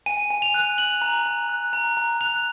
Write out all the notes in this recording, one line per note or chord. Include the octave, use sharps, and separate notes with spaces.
G#5 D#7
G#5
F7
F#6
F#6 F#7
A#5
A#5
F#6
A#5
A#5
F#6 F7